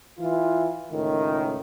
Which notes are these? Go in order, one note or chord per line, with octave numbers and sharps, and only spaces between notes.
E3 F4
C#2 A2 D#3